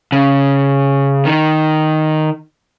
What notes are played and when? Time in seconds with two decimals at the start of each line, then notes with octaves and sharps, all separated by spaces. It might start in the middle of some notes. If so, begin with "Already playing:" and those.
0.12 C#3
1.25 D#3